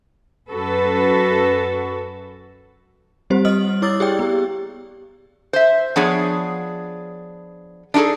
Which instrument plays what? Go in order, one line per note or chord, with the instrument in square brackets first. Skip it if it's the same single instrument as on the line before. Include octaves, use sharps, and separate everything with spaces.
[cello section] F#2 F#4 A4 B4
[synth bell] G3 C4 G4 C5
G3 D#5 D#6 F6 F#7
E4 C#5 D6 E6 A6
G4 G#4 D5 G5
B3 G4
[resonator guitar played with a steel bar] C5 E5
F3 B3 D4 G#4 C#5
D4 D#4 F#4 G#4 A4